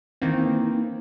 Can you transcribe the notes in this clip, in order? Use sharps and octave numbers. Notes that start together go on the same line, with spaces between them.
D#3 E3 A#3 C4